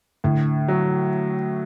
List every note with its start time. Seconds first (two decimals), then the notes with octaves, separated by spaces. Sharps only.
0.24 A2 D3
0.68 F#3